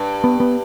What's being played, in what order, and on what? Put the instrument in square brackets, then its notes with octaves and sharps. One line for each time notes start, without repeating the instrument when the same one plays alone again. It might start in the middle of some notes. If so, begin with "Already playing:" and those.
Already playing: [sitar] G2
[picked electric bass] B3
B3